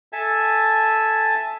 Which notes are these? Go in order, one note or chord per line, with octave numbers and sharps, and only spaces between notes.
A4 E5 G#5 A5